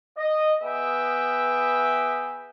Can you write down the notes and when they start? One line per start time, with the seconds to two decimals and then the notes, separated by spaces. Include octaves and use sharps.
0.18 D#5
0.62 B3 G#4 B4 E5 G5